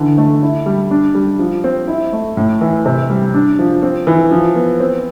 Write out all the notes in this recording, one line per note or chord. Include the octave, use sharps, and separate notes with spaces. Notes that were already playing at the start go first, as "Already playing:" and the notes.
Already playing: D3 E3
A3
E4
G3
D4
G3
F3
C4
E4
A3
A2
E3
C3
G3
D4
F3
C4
E3
F3
B3
C4